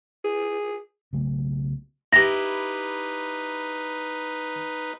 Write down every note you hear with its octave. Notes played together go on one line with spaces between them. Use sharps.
G#4
B1 C#3 F#3 A3
D#4 E4 G4 B4 A#6